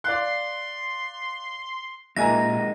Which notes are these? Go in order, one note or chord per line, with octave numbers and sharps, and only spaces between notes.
D5 F5 C6 F#6
A#2 G#3 A#3 D#4 E5 G#5 A#5 A#6